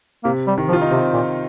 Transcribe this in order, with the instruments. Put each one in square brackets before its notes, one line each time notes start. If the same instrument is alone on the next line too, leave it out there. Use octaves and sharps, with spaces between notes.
[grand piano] C3 [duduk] A#3
[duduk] G3
[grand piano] D#3
[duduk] F3
[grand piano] F4
D#4
[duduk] C3 [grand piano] C4
[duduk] A#2